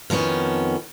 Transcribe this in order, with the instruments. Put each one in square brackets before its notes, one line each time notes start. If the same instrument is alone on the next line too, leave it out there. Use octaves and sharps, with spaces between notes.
[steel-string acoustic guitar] F2 D#3 G3 B3 C#4